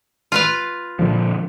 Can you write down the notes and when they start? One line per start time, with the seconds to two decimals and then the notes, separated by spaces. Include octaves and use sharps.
0.32 F4 B4 F5
0.99 A#2 D3 F3